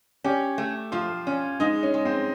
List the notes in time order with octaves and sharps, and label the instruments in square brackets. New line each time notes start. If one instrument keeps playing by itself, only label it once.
[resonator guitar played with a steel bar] C#4 [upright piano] G4
[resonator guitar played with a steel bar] A3
[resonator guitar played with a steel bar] F3 [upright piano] F4
[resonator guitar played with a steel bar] C#4
[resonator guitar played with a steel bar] G#3 [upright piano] D#4
[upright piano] C#4
[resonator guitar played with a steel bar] G#3
[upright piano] C4